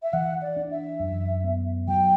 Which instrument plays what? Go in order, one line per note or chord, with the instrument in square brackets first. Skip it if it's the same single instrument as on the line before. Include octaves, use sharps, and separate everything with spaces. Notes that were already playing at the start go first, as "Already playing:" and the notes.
[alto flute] E5
[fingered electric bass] E3 [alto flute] F#5
[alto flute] D5
[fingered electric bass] D4
[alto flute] E5
[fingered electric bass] F#2
B3
[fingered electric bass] F#3 [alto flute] G5